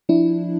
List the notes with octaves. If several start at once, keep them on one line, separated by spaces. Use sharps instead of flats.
F3 D4 E4